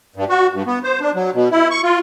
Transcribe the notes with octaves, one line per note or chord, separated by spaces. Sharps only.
G2
F#4
G2
B3
C5
D4
F#3
B2
E4
C#6
F4